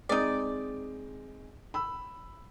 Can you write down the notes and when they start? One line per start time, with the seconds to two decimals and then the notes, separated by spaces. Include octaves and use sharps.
0.09 G#3 C4 D#4 D5
1.74 B5 E6